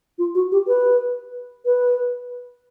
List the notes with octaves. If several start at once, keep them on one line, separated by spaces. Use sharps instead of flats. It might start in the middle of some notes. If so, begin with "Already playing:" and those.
F4
F#4
G4
B4
B4